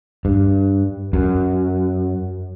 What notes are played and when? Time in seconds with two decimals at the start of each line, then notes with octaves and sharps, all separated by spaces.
0.25 G2
1.13 F#2